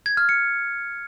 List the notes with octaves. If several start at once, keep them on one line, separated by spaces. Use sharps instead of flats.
G#6
F6
C#7